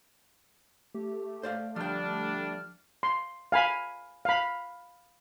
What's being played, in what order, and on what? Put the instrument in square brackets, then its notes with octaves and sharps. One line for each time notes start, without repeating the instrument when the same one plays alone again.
[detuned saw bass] A3 [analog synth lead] G4
[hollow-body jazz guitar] C5 D5 F5
[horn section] D3 G3 D4 [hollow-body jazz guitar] F3 G5 [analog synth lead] F6
[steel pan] C6
F5 G#5 B5
F5 B5